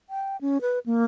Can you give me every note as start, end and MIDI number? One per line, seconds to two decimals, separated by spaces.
0.10 0.37 79
0.41 0.58 61
0.61 0.79 71
0.86 1.04 58